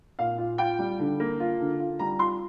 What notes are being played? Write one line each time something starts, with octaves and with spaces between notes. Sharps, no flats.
A#2 F5
F4
F4 G5
G3
D3
A#3
F4
D3
F4
G3 A#5
F4 C6